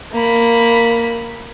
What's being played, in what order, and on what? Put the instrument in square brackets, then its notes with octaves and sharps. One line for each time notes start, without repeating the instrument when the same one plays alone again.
[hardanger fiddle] A#3 B5